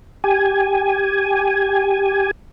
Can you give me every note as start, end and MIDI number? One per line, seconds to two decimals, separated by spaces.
0.24 2.31 67
0.24 2.31 80